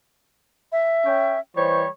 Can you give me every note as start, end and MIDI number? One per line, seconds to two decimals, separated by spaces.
0.72 1.39 76
1.05 1.36 61
1.05 1.36 79
1.56 1.87 52
1.56 1.87 55
1.56 1.81 72
1.56 1.87 73